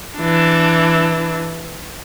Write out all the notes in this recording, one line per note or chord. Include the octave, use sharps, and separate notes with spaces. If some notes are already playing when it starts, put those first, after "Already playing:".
E3 D4